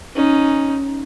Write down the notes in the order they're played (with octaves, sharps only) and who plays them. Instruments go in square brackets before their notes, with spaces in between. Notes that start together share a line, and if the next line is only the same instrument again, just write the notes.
[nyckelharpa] C#4 D#4